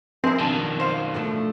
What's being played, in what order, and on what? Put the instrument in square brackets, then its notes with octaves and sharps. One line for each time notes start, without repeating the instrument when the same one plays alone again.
[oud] F3 A#4 D#5 [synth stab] C4 [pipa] E4 G#4
[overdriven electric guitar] B2 D#3 [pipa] D4
[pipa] C5 F5
[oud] D3 F3 A3